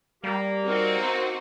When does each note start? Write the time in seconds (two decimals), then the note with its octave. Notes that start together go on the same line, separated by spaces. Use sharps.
0.24 G3 A#3 G4
0.65 C4 D#4 F#4 A#4